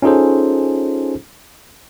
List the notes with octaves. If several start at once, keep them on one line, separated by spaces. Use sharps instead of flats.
C#4 D#4 F4 G#4 A4 C5